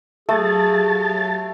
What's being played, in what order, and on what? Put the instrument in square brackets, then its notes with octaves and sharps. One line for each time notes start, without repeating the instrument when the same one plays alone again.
[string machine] F#3 G4 F5 [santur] A3 [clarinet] G#4 [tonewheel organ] A5